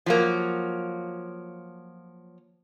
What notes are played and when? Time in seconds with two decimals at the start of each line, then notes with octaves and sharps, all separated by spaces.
0.06 F3 F#3 A#3